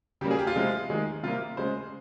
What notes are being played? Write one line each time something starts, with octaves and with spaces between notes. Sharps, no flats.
C#3 G3 A#3 G4
G#4
G4
F4
C3 F3 G#3
D#3 G#3
C3 G3 A#3 F4
C#3 G#3 C5